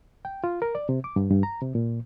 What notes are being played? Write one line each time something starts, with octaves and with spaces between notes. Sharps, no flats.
G5
F4
A#4
D5
C3
D6
G2
G2
A#5
C3
A#2